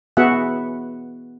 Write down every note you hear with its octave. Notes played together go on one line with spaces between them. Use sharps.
B3 F#4 G#4 E5 F#5